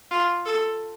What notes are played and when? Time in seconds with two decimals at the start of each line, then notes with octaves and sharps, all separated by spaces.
0.11 F4
0.45 A4